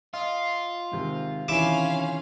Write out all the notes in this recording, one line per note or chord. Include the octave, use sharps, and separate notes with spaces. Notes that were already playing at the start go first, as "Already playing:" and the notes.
F4 D#5
G#2 C3 D#3
C3 D#3 E3 C#4 E4 F5 D6